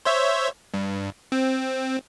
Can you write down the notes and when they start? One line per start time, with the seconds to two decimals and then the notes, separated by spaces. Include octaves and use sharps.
0.05 C5 C#5 E5
0.74 G2
1.32 C4